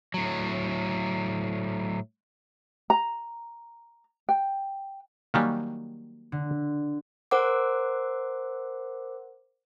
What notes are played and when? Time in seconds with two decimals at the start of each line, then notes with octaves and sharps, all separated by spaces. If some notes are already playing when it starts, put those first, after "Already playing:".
0.14 A2 F#3
2.90 A#5
4.29 G5
5.34 D#3 F#3 G3 A#3 G#5 C#6
6.32 D3
7.31 A#4 C5 F#5 D6